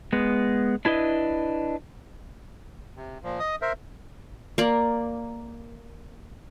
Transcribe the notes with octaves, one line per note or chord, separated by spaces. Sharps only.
G#3 B3
D4 E4 B4 D#5
C3
A#2 F3
D#5 D#6
A#4 C5 E5
A#3 D5